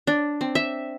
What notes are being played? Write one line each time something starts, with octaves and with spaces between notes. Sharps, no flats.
D4
C4
E5